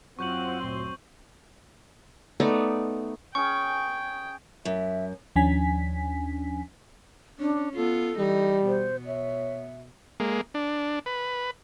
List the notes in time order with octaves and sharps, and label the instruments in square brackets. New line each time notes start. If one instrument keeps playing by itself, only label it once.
[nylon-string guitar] F#2 F#3 [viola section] C4 [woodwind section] F4 F#5 [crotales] C#6 G6 F#7
[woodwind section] D2 A#2 C6
[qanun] A3 B3 D#4 D5
[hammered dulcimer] C#4 G#4 [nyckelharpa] G5 [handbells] C#6
[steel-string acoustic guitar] F#2 [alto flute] E5
[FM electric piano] D#2 F3 C#4 D4 G#5 B6
[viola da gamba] C#4 [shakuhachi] D4
[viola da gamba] B3 F4 [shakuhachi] A4
[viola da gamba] E3 D#4 [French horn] G3
[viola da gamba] B2 B3 [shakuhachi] C5
[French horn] C#5 [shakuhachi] E5
[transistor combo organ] G#3 A#3
D4
B4